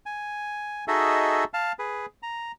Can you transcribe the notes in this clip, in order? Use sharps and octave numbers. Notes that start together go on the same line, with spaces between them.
G#5
D#4 F#4 G#4 A4 D#5 E5
F5 A5
G#4 B4
A#5